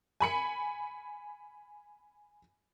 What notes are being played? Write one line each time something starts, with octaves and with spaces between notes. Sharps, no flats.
G#5 B5 C#7